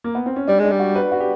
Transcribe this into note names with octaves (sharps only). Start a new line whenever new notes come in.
A#3
B3
C4
C#4
G3 D4
G#3
D4
G3
F#4
B4
F#4
G4